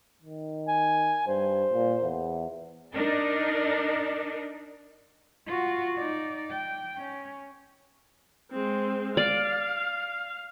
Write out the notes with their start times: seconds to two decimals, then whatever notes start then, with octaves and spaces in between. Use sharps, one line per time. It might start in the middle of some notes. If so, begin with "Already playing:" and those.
0.22 D#3
0.68 G#5
1.27 G2 C5
1.72 A#2
2.03 E2
2.93 D4 D#4 A#4 D5
5.46 F4 F#4
5.97 D#4 D5
6.50 G5
6.98 C#4
8.51 G#3 C4
9.17 D5 F5